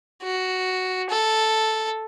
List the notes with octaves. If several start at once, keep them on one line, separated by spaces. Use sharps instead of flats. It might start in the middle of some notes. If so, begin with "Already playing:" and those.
F#4
A4